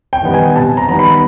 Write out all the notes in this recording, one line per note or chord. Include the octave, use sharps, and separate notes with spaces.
G5
D#3 G3 B3 D#4
G#5
C3 A5
A#5
D#3 G3 B3 D#4 A#5
B5